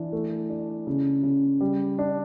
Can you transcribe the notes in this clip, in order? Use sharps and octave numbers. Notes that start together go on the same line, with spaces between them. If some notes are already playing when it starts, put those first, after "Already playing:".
Already playing: E3 D4
A3
D4
C#3
C#3
G3
D4